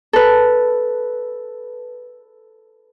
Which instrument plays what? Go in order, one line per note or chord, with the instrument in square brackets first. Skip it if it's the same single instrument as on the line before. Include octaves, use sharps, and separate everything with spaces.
[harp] A4 B4